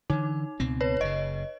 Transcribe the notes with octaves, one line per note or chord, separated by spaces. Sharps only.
D3 E3 D#4
C#2 B2 C4
B4 C#5
F#1 C#3 D#5